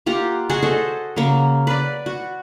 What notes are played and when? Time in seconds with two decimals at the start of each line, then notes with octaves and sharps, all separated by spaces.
0.06 A#3 F4 G4 F#5
0.50 F#4 G#4 D#5 C#6
0.63 F#4 A4 C5 D#5
1.16 C#3 F#3 A#3
1.67 B4 D5
2.06 F#4